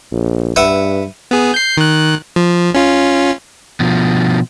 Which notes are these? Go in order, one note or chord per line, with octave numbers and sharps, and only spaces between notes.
A#1
G2 B4 E5 F#5
B3 G#4
G6 C7
D#3 F#6
F3
C#4 F4
B2 F3